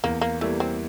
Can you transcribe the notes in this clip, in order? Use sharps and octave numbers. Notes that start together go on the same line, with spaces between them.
E2 A#3
A#3
E3 G3 A3 A#3
C4